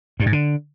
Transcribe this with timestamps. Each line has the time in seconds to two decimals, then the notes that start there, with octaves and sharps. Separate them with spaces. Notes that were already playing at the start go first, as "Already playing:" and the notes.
0.20 G2
0.26 G#2
0.33 D3